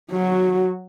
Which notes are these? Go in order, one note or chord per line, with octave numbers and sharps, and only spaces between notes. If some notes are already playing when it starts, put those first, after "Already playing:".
F#3 F#4